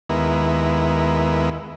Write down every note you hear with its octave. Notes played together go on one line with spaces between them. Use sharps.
D#2 G#3 B3 E4 A#4